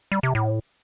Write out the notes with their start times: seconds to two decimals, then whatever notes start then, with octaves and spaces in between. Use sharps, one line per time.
0.12 G3
0.23 C3
0.35 A2